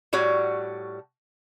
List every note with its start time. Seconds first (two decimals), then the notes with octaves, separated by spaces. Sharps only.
0.13 A2 G3 F#4 C#5